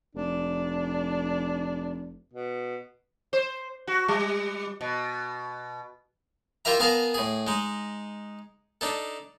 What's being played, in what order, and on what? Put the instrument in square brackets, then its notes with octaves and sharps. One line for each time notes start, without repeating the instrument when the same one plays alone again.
[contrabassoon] F1 [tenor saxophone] D4
[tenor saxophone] B2
[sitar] C5
F#4
G3
B2
[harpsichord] E4 F4 G4 A#4 E5 A#5
B3 G#4 A#4 F5 A5 A#5
A2 G#4
G#3 D#4
D4 D#4 A4